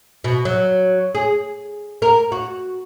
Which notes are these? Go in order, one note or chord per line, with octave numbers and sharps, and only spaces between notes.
B2
F#3
G#4
A#4
F#4